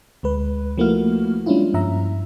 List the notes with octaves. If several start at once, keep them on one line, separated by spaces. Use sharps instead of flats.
D2 G#3 B4
F3 A3 A#3 E4 F#4 F6
G3 G#3 C#4 D4 E4 F4
G2 F3 E5 A#5